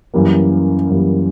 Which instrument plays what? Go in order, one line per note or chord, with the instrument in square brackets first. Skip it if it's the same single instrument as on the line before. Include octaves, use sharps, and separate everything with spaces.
[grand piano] F#2 E3 G3 A#3
F#2 E3 G3 A#3